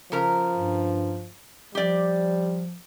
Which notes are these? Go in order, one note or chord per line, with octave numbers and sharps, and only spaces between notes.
C#3 F3 A#4 A#5
G2
F3 G3 G4 D5